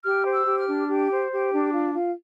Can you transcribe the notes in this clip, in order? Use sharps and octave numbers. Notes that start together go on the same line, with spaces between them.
G4 F6
C5
E6
G4
F6
D4
G4
C5
G4
D4
F4
F4